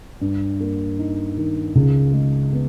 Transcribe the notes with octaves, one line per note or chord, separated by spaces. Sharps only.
G2
A#3
D#4
D#3
C#2
G#3
B3